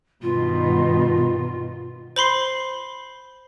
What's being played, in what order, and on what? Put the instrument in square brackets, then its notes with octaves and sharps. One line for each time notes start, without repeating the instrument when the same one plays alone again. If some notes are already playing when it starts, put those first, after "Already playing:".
[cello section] G2 B2 D#3 [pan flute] F4
[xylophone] C5 B5 C6 C7